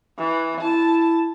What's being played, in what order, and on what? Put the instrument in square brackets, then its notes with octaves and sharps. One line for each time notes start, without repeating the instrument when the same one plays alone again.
[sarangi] E3
[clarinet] E4 [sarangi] A5